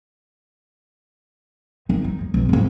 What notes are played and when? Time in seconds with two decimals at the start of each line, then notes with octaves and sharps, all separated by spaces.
1.89 D#3 D#4
2.04 D#4
2.20 D2
2.34 E1 B1
2.49 A#1 G#2